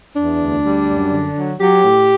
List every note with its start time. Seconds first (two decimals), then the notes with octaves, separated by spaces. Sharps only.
0.15 E2 D4
0.39 D2
0.63 G3
0.87 F#2
1.11 D3
1.36 F#3
1.60 F#3 G4
1.84 A2